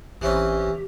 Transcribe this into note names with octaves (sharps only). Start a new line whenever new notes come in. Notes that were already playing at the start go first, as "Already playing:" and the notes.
A1 E3 C4 C#4 G4